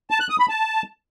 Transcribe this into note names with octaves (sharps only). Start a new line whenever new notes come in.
A5
F#6
D#6
B5
A5